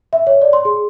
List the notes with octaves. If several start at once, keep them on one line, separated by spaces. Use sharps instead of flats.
E5
C#5
D5
C6
G#4